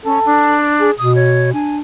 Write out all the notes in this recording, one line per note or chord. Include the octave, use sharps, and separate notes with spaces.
C#4 A4
D4
G#4
B2 D#6
C#5
D4 G#5